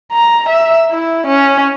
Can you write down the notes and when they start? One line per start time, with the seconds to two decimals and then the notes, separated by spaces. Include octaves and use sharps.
0.13 A#5
0.49 E5
0.90 E4
1.27 C#4